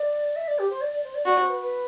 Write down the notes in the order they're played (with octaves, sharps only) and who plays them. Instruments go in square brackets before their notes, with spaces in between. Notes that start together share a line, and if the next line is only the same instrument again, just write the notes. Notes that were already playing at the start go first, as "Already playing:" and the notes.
Already playing: [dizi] D5
E5
D5
G4
C5
D5
D5
C5
D5
[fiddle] F#4 [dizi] D5
[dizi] C5
B4
B4